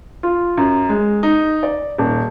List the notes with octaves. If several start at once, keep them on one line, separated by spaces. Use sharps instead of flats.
F4
F#2
G#3
D#4
D5
D#1